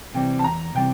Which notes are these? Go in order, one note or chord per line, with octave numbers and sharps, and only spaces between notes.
C3 E3 G3 C4 G5
A5
E2 A#5
C3 E3 G3 C4 G5